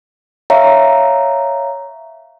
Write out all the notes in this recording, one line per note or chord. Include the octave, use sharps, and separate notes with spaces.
C#5 E5 F5 A#5